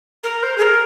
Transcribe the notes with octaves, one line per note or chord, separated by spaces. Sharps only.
A#4
C5
G#4
A#4